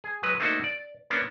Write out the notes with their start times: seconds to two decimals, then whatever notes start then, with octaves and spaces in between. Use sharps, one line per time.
0.04 G#4
0.23 F#3 G#3 B4
0.40 A3 A#3 D4 D#4 F#4 C5
0.64 D5
1.10 A#3 B3 C#4 D4